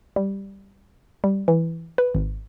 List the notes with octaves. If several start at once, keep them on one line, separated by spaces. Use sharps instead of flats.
G3
G3
E3
B4
G#1